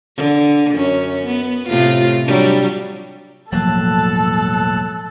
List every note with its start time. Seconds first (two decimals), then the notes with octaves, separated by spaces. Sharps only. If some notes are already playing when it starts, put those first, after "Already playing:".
0.17 D3
0.75 F#2 C#4
1.26 B3
1.69 A2 C3 F4
2.25 F#3 G3 D4
3.52 E1 A2 F3 F#3 A#3 A4 A5 F#6